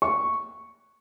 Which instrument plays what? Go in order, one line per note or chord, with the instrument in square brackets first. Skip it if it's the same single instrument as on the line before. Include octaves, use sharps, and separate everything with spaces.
[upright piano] C#6